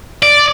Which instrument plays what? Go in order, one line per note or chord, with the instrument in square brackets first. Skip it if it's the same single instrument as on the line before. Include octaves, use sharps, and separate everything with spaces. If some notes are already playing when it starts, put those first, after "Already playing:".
[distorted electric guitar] D5